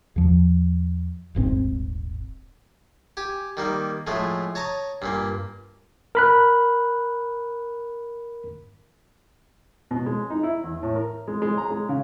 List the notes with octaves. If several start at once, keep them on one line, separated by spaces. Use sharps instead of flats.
E2 F3
D#1 G#1 G#2 C4
G4 G#5
D#3 G3 A#3
A2 F3 G#3 A3
C#5 A5 A#5 D#6
G2 A#2 A#3
A#4 B5 F#6
B2
G#3
D#4
E4
E2
A2
A#4
G#3
G#3
A#5
G#3
C#3